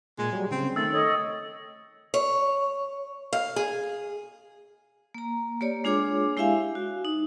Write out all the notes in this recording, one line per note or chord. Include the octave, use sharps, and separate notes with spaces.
A#2 G#3 G#6
F#3 G3
C#3 C4
D#3 A3 E6 A6
A4 C#5 D#5
C#5
F5
G#4
A#3 A#5
A#3 G4 C#5 D5
G#3 D4 F4 G#4 C#5 D6
G#3 E4 G4 E5 F5 G#5
F#4
D#4